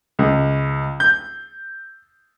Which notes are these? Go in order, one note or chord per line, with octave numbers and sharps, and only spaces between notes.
C#2
G6